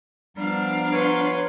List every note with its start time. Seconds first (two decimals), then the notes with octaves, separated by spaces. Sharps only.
0.37 F3 G3 B3 D4 F5 A#5
0.93 B4 C#5 C6